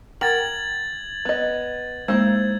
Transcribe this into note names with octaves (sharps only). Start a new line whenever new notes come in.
A#4 F#5 G5 G#6 A6 F#7
B3 D#5
G#3 A#3 D#4 E4 C5 G#6